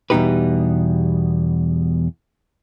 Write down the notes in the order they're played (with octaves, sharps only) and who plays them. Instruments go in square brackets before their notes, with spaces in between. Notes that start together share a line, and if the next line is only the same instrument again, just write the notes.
[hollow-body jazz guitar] E2 B2 G3 D#4 G4 B4